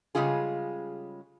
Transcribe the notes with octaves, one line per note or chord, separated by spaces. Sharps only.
C#3 G3 G#3 F4 G#4